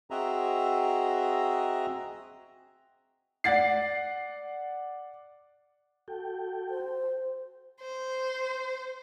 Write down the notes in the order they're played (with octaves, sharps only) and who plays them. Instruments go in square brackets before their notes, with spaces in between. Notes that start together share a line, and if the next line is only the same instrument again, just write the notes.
[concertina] C4 F#4 G#4 D#5 E5 A#5
[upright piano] D5 F#5 A6 C7
[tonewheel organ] F#4 A4 G5
[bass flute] C5
[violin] C5